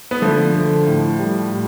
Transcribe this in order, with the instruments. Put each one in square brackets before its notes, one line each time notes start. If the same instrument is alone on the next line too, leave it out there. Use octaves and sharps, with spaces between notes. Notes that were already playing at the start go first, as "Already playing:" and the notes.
[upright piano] B3
[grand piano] D3 [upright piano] F3 A3
[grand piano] D3
A2
G3
A2